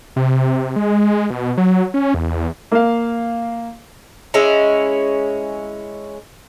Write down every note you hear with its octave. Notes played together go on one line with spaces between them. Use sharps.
C3
G#3
B2
F#3
C#4
E2
A#3 F5
G#3 C#4 E4